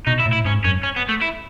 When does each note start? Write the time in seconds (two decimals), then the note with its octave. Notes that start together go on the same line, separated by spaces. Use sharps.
0.07 B2 D#4
0.20 E4
0.26 A2
0.33 E4
0.45 G#2 C#4
0.64 F#2 C#4
0.83 C#4
0.97 B3
1.09 A3
1.22 E4